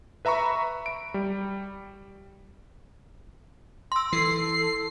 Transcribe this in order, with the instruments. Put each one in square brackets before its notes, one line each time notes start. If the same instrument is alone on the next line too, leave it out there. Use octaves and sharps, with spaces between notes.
[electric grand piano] B4 E5 A#5 B5 C#6
D7
G3
[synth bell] C6 E6
[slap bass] E3 [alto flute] A4 [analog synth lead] C7